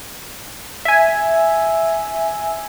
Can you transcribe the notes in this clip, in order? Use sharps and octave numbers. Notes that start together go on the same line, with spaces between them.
E5 G#5